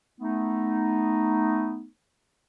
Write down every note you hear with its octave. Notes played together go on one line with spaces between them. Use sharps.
A3 B3 D#4